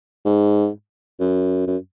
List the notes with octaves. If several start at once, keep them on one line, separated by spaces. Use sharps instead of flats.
G#2
F#2
F#2